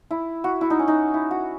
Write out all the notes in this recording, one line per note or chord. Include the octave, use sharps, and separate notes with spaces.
E4
F#4
E4
D#4
C#4
D#4
E4
F#4